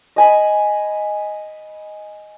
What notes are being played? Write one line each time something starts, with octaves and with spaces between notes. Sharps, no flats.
D#5 G#5 B5